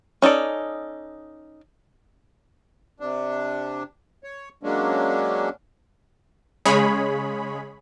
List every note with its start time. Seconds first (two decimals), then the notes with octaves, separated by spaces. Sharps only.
0.22 C#4 D#4 A4 D5
3.00 C3 D4
4.24 C#5
4.63 F#3 G#3 A#3 C#4 D4
6.65 C#3 G#3 G#4 C#5 B5